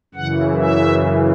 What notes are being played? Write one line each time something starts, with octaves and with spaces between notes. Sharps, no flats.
F#2 C#3 E3 F#5
E5